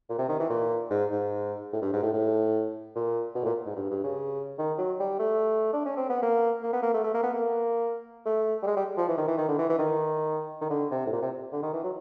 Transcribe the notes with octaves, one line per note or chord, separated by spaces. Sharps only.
A#2
C3
D#3
E3
A#2
G#2
G#2
A2
G2
G#2
A2
A2
A#2
B2
A2
A#2
G#2
G2
G2
C#3
D#3
F#3
G3
A3
D4
C#4
C4
B3
A#3
A#3
B3
A#3
A3
A3
A#3
B3
A#3
A3
G3
G#3
G3
F3
E3
D#3
E3
D#3
D3
E3
E3
D#3
D#3
D3
C3
A2
A#2
C3
D3
D#3
E3
F#3